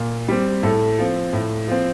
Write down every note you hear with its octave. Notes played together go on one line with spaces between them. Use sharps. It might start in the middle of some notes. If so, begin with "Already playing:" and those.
Already playing: A#2
G3 C4
A2 A4
F3 C4
A2
F3 C4